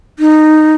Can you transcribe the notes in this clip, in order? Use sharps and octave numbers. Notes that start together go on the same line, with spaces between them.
D#4